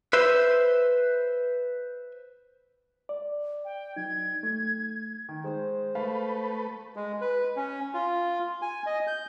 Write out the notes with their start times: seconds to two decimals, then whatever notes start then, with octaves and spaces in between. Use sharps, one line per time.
0.13 B4 C5 E5
3.09 D5
3.65 G5
3.96 F#3 D#4 G#6
4.43 A3
5.29 D#3
5.44 G#3 C5
5.95 A3 B4 F5
6.96 G#3
7.21 B4
7.56 C#4
7.94 F4
8.62 G#5
8.86 D#5
9.07 G6